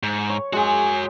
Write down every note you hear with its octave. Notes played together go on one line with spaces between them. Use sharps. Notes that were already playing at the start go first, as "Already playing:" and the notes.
G#2
C#5
G#3 F#4 G#4 G#5